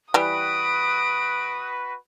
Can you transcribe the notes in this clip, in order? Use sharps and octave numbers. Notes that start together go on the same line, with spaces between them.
E3 G3 F#4 B4 D#6 D7